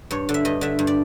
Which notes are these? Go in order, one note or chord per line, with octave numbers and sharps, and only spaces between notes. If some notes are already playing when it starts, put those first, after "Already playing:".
G2 C#5
D3
E5
G2 D#5
D3 E5
G2
D5